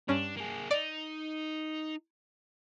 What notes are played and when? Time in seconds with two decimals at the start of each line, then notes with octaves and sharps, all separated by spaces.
0.08 G2 C#4 D4
0.37 A#3 G#4
0.71 D#4 D5